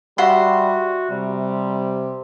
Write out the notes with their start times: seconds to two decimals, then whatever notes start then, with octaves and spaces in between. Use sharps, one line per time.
0.18 G3 F#4 E5 F#5 C6
1.10 C3 G3